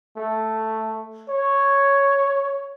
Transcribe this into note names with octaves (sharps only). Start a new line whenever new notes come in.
A3
C#5